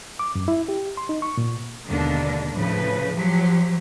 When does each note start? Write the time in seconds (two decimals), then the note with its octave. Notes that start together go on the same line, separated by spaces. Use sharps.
0.19 D6
0.35 F#2
0.48 E4
0.69 G4
0.97 C6
1.09 D#4
1.22 C#6
1.37 A#2
1.86 D#2 B2 D3 G#3 A#3 D4
2.53 A2 C#3 F3 B4
3.15 F3 F#3 G4